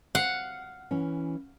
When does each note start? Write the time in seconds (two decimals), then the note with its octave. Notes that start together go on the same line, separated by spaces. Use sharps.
0.15 F5 F#5
0.91 E3 C#4